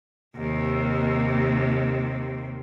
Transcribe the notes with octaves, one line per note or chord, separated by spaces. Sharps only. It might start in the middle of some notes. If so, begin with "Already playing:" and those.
D#2 C3